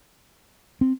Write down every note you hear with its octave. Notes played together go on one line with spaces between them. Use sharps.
C4